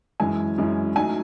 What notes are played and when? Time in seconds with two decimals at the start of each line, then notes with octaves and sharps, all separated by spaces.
0.20 F#2 E3 G#3 C#4 E4 G#5
0.58 F#2 E3 G#3 C#4 E4
0.96 F#3 A3 D#4 G#5